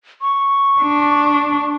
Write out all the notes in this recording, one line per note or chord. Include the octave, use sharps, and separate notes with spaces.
C#6
D4